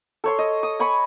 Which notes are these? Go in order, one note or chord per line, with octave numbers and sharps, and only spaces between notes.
A4 C#5 C6
D#5
D#6
C#5 G#5 B5 C#6